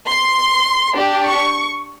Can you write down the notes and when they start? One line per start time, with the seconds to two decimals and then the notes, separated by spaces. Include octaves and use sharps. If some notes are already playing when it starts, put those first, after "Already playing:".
0.09 C6
0.95 D4 G4
1.24 C#6